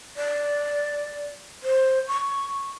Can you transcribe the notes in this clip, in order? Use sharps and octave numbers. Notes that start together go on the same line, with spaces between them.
D5
C5
C#6